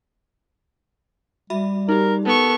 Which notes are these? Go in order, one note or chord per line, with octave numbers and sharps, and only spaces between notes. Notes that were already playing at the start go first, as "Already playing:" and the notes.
G3 F#4 E5 B5
D#4 G4 A#4
B3 A4 A#4 C#6